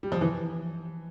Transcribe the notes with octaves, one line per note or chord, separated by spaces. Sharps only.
G3
F3
E3